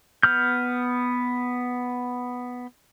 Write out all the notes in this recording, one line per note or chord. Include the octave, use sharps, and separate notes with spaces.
B3 F6 G6